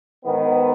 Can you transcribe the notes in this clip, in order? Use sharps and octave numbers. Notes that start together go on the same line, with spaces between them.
G#2 D#3 B3